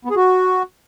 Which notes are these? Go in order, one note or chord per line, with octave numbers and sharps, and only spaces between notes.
B3
G#4
F#4